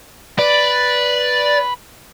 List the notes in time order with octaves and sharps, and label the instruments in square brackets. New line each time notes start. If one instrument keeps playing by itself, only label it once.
[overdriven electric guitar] B4 [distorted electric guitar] D5